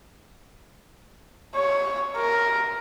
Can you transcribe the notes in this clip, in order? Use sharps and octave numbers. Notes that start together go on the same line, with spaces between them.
C#5
A#4